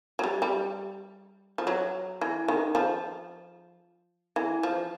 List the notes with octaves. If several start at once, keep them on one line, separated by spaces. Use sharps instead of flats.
F#3
G3
G3
F3
F#3
E3
D#3
F3
E3
F3